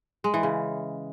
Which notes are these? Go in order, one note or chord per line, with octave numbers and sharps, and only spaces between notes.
G#3
E3
C#3